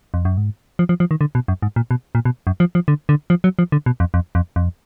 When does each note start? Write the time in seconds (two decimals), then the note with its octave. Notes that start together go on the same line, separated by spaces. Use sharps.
0.14 F2
0.25 F#2
0.37 G#2
0.79 F3
0.89 F3
1.00 F3
1.11 D#3
1.21 D3
1.35 B2
1.48 F#2
1.62 G#2
1.76 A#2
1.91 B2
2.15 A#2
2.25 B2
2.47 F#2
2.60 F3
2.75 F3
2.88 D3
3.09 D3
3.30 F3
3.44 F#3
3.59 F3
3.72 D3
3.86 B2
4.00 F2
4.14 F2
4.35 F2
4.56 F2